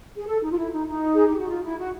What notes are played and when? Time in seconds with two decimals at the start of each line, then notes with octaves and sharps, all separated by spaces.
0.17 G#4
0.27 A4
0.42 D#4
0.50 F4
0.57 E4
0.72 D#4
0.87 D#4
1.14 G#4
1.26 G4
1.37 F#4
1.48 F4
1.63 E4
1.78 F#4